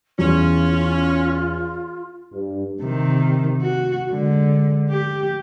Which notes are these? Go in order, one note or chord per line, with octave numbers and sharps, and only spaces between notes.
E2 C#4 F4
G2
C3 D#3
F#4
D3 G#3
G4